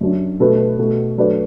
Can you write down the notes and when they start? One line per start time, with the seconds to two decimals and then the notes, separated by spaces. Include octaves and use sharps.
0.01 F#2 F#3 D4
0.40 B2 A3 F#4 B4
0.78 B2 A3 F#4
1.18 F#3 A3 D4 B4 D5